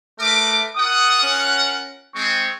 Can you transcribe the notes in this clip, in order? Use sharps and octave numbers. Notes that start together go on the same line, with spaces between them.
A3 A#4 B4 D6
F4 A#4 F#5 D#6
C#4
G#3 C4 C#6